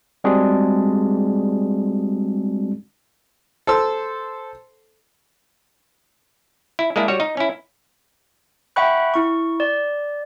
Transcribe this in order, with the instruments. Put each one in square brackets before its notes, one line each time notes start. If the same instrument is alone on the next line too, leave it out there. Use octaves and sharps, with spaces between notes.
[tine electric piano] G3 G#3 C4 D4 F#4 G#4
[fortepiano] A4 C5 E6
[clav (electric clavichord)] E4
G#3 A#3 D4 E4
G3 F#4 C#5
D#4
C#4 E4
[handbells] E5 F#5 G5 B5 C#6 F#6
E4 C#6
D5